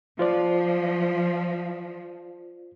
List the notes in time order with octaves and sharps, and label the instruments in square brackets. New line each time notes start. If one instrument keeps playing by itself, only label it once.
[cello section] F3 [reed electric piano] F4 C5 D5